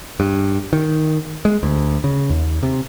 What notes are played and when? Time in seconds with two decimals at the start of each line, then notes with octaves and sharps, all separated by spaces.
0.20 G2
0.73 D#3
1.45 G#3
1.63 D2
2.04 C#3
2.30 D#2
2.63 C3